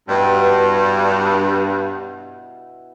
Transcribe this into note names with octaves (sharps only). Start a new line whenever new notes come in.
G2 B2 E4